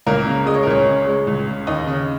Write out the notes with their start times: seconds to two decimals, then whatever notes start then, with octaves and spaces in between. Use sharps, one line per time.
0.06 C#2 A#3 A#4
0.26 C#3
0.46 G#3 D#5
0.54 C#5
0.63 A#4
0.66 C#2 C#4 C#5
0.87 C#3
1.07 G#3
1.27 C#2
1.47 C#3
1.67 D#2 D#4 D#5
1.87 C#3